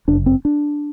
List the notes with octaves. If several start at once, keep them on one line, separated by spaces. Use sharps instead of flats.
G1 F#2 C#3 D4
C4
D4